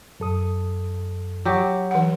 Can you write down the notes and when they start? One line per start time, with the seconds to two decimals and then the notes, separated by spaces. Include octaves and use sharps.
0.20 F#2 A4 D#6
1.45 F#3 G4
1.91 E3 F#5